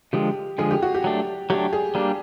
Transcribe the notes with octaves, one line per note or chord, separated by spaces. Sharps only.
D3 F3 G#3 G4
D3 F3 G#3 G#4
G4
F#4
G4
F#3 A3 D4
F#3 A3 D4 G4
G#4
G3 A#3 D4